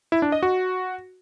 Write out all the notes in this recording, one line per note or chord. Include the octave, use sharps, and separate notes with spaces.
E4
D4
D#5
F#4